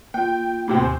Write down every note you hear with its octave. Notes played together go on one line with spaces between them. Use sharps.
A#3 F4 G5
A2 C3 C4
D#2 C5 G#5